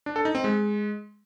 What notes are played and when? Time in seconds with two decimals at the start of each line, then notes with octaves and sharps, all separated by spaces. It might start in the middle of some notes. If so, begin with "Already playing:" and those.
0.06 D4
0.16 A4
0.25 D#4
0.35 C4
0.44 G#3